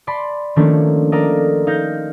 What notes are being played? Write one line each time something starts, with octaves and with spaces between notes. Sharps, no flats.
D5 A5 B5 C6
D#3 F3 A3 A#3 C#4 D4
A4 A#4 D5 D#5 F5 A#5
D#4 F5 G6 A#6